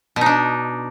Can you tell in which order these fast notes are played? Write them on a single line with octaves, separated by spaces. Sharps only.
B2 D#4 D4